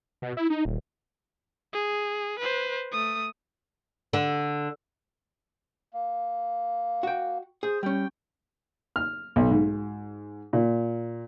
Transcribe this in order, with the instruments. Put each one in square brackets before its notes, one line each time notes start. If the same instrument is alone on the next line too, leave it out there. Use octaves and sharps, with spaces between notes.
[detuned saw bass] B2
E4
D#4
D#1
[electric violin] G#4
B4 C5
A3 D#6
[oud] D3
[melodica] A#3
[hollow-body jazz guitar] F#4 G5
[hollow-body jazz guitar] G#4 [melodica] C5 D#6
[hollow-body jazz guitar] G3 C#4 [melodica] G5
[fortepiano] F6
B1
G#2
A#2